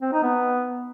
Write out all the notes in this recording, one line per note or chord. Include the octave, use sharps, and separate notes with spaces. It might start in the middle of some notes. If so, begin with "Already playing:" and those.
C4
D#4
B3